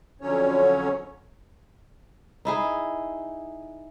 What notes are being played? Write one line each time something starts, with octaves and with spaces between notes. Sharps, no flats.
F2 D3 F#3 C#4 C#5
D#4 E4 G#4